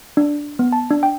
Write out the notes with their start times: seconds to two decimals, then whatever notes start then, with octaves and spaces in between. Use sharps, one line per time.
0.17 D4
0.59 B3
0.72 A5
0.91 D4
1.03 G5